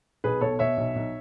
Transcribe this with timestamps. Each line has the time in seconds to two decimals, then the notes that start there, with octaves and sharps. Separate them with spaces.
0.24 B1 G#4 B4
0.41 B2 A4 C#5
0.59 B2 C#5 E5
0.77 B1
0.96 B1